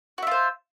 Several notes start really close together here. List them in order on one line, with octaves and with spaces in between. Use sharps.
F#4 E5 F4 C5